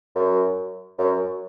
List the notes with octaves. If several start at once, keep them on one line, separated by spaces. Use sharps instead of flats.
F#2
F#2